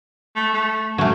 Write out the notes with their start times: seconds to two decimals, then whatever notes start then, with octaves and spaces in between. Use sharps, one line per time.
0.36 A3
0.53 A3
0.98 F#2 F#3 A3